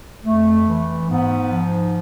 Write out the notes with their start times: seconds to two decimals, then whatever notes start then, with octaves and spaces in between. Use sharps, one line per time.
0.24 F2 A3
0.67 E3
1.09 G#2 B3
1.52 F3